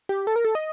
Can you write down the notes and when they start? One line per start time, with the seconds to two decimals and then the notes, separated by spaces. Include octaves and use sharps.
0.09 G4
0.27 A4
0.36 A#4
0.45 A4
0.55 D#5